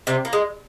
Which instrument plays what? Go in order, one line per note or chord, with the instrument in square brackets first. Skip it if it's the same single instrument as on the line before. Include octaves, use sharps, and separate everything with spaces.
[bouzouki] C3 C4
A#3
G#3